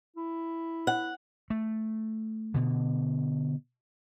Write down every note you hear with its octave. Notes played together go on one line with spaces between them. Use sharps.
E4
F#5
A3
B2 D3